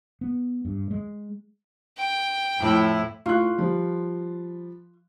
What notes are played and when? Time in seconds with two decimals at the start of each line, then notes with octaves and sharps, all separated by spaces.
0.21 B3
0.65 G2
0.91 G#3
1.97 G5
2.59 F2 A2 E4
3.26 A2 F4 C#6 F#6
3.58 F3 G3